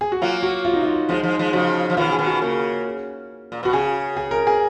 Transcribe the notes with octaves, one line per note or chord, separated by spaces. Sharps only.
G#4
F#4
F#3 A#3 F4
F#4
F4
D#4
F4
F3 G#3 D#4
F3 G#3
F3 G#3
C#3 F3 F#4
F3
B2 D#3 F4
G#4
B2 D#3
F#4
C#3 A#3
A#2
B2 F#4
C#3 G#4
G#4
A#4
G#4